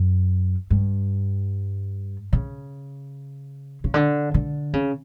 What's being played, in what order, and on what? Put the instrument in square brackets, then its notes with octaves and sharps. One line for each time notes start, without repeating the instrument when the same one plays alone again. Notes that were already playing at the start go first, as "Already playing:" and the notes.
Already playing: [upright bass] F#2
G2
C#3
C#3
D3
D3
C#3